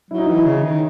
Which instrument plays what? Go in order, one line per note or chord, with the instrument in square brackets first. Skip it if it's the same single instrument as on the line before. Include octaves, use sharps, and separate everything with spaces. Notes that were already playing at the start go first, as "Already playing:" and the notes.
[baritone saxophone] F#3 [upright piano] E4
[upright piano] D#4
[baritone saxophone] E3 [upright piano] E4
[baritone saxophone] C#3
D#3